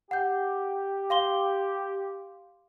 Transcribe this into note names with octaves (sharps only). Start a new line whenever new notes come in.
G4 F#5 G6
F5 C6 G7